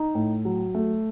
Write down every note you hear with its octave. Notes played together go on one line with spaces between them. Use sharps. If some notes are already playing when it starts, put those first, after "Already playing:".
Already playing: D#4
A2
F#3
A3